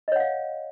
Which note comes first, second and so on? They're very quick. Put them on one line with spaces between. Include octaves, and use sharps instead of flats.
D#5 C#5 F#5 F5